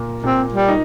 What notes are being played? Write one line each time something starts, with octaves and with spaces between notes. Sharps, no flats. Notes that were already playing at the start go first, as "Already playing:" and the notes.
Already playing: A#2 A#3
A#2 C4
G3
D#4